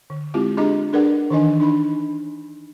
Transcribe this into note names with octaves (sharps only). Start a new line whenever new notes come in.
D3
G#3 C4 E4 F4 G4
D4 G4 G#4 D#5 A#5 D6
D4 G#4 A#4 B4 D5 F#5
D#3 E3 D4 D#4 D#5 G#5
D4 D#4 B5